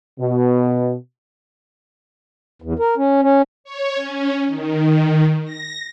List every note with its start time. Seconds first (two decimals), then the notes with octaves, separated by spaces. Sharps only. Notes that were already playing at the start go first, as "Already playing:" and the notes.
0.19 B2
2.62 E2
2.79 A#4
2.97 C#4
3.22 C#4
3.64 C#5
3.95 C#4
4.48 D#3
5.44 A#6